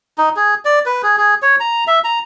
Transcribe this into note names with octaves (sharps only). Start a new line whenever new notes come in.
D#4
G#4
D5
B4
G#4
G#4
C#5
A#5
E5
A#5